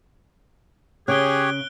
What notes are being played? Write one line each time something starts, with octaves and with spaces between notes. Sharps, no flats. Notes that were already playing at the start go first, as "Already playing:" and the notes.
C#3 G4 G#4 C#5 F#6 D7 G7